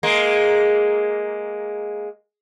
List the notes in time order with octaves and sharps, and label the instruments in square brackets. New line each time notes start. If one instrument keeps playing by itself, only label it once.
[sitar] G#3 A#3